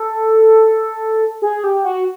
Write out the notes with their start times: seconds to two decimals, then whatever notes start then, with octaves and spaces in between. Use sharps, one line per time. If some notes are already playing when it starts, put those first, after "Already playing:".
Already playing: A4
1.42 G#4
1.64 G4
1.84 F#4